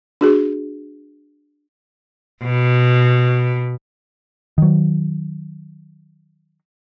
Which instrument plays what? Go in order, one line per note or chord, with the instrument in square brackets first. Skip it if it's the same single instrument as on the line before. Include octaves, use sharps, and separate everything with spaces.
[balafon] D4 F#4 G#4
[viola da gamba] B2
[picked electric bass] D#3 F#3